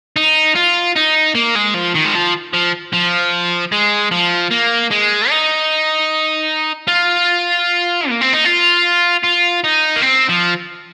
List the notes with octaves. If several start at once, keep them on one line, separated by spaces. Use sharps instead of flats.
D#4
F4
D#4
A#3
G#3
F3
D#3
G#3
F3
F3
F3
G#3
F3
A#3
G#3
D#4
F4
A#3
C4
D#4
F4
F4
D#4
A#3
C4
F3